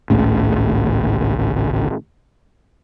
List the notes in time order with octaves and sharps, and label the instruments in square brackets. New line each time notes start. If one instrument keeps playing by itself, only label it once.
[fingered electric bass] G#1 C#2 A2 C#3